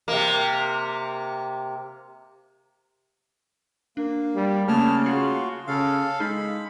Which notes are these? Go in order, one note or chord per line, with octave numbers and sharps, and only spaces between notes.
C3 A#3
A#3 D4
G3
C#3 A3 A#3 A5 F6
F4 F#4 G#4 C7 C#7
C#3 A4 F5 F6
G#3 D#4 B5